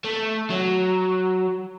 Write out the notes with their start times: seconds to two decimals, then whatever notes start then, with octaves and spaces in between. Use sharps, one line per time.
0.04 A3
0.50 F#3